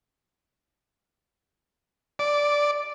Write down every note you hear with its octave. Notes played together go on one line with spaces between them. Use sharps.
D5